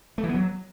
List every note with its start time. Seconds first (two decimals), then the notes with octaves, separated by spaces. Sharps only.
0.18 A3
0.23 E3
0.29 B3
0.34 F#3